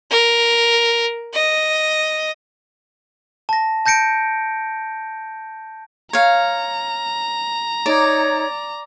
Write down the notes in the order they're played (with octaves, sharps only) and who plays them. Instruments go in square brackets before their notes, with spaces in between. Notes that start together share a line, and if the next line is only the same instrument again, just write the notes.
[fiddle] A#4
D#5
[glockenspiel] A5 A#6
A5 G6 A#6 C#7 D7
[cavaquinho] C#5 F5 [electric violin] A#5
[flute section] D#4 C#5 [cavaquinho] D5